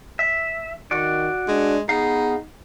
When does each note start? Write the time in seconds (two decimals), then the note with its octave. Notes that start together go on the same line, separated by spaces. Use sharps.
0.19 E5
0.91 D#3 F#4 D5
1.48 G#3 D4
1.89 B3 D#4 G#4 F5